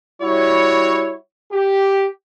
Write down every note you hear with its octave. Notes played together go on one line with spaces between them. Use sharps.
G3 E4 F#4 C#5
G4